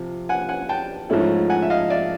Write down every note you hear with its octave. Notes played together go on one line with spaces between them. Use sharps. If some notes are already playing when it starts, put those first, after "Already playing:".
Already playing: C3 F3
F#5 G#5
F#5 G#5
G5 A5
G#2 F3 A3 C#4 E4
F#5 G#5
E5
D#5 F5
D5 E5